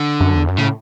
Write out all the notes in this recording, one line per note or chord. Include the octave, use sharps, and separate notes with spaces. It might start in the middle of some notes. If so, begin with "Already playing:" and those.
Already playing: D3
F#2
E2
F#2
A2 C#3